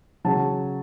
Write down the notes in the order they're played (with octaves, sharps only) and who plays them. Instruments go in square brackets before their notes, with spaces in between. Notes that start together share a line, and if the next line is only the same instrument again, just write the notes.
[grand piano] C#3 F#3 A5